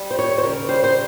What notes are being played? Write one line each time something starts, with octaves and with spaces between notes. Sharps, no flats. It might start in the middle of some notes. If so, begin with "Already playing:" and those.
Already playing: G3
C5
D#2 C#5
C5
C#3 A#4
G3 C5
C5